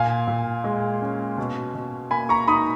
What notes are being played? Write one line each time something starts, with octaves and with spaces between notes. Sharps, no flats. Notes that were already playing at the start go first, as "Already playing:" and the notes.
Already playing: A#2 F5 G#5
A#2
G#3
C#4
B2
B2
A#3 G#5 B5
A#5 C#6
D#4 B5 D#6